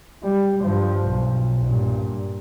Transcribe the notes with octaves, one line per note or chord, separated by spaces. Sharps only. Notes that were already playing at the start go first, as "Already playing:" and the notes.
G3
G2 F3
B1
G2 A#2